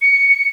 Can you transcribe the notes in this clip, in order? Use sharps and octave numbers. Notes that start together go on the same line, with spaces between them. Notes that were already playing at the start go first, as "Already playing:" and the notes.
C#7